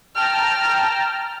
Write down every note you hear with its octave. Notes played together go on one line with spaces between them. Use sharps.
G5 A5 A#5 F6